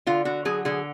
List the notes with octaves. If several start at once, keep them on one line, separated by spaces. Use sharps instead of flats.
D3 F4
D3 F#4
F#3 G#4
D3 G#4